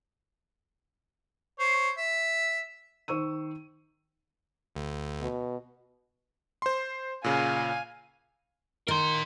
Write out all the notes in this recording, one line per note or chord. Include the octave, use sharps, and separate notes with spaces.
C5 C#5
E5
D#3 C5 C#6 E6 D#7
D2
B2
C5 C6
A#2 C#3 F5 G#5
D#3 A#4 C6